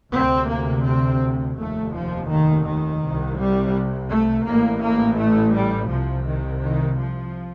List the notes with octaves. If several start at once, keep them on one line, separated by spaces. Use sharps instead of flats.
D2 C3 C4
A#3
C4
F1 D#2 A3
F3
D#3
D#3
C2 C3
G3
A3
A1 A2 A#3
A#3
A3
G3
C2 C3 F3
D#3
D#3
F3